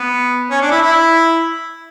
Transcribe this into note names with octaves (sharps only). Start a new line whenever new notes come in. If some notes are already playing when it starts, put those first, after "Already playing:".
Already playing: B3
C#4
D4
E4
E4